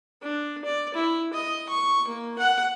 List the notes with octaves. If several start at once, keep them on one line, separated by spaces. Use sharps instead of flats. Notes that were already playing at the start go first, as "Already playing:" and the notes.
D4
D5
E4
D#5
C#6
A#3
F#5